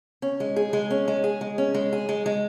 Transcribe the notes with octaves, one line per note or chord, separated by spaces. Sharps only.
C#4
G#3
G#4
G#3
C#4
G#3
G#4
G#3
C#4
G#3
G#4
G#3
G#3